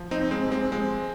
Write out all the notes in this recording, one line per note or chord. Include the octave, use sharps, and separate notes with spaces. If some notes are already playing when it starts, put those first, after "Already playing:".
Already playing: F3
C4 D#4
F2
G#3 C4
C3
G#3 C4
F3 G#3 C4